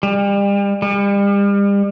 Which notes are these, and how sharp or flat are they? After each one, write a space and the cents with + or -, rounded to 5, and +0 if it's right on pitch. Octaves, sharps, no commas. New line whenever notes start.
G3 +40
G3 +40